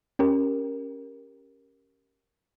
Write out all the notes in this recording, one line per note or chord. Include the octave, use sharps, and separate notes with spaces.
C#4 G4 A#4